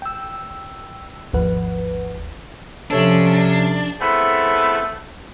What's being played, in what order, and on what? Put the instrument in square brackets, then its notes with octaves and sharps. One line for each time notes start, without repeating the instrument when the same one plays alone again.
[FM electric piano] G5 E6
G#1 D#2 F3 B4 F#5
[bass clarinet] C3 [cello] F3 C#4 [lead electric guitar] D4 [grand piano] A4 C#5
[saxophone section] A3 B3 C4 E4 G#4 A4